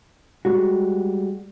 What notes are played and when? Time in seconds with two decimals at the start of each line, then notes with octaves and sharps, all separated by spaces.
0.45 G3 G#3 F#4